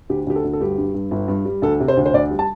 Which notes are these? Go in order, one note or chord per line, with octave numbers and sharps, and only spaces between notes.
D2 G4
D2 G4
A4
D2
A4
G2 G4
G2
G2
G1
G2
G3
D2 A4
C3
C5
D2
C5
D2 D5
G3
A5